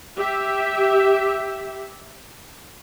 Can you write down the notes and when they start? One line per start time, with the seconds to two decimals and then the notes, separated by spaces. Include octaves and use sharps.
0.16 G4 E5